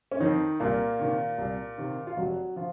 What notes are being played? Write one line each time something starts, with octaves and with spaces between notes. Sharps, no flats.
C#4
F2 D#3 D#4
C2 A#2 A#3
C3 D#3
C2
C3 D#3
F4
F1 F#3 F#4
F3 F4